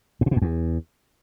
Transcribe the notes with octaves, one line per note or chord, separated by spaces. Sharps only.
G2
A#2
B2
F2
E2